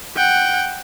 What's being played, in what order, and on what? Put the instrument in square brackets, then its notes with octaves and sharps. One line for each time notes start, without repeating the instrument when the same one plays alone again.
[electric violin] F#5 G5